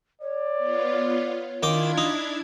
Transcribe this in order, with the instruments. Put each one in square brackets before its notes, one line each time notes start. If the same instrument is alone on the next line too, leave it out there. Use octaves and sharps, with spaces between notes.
[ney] C#5 [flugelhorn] D5
[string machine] B3 F4
[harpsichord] D#3 G5 D6 [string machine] D4 E4 G#6 [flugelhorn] F4
[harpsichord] D#4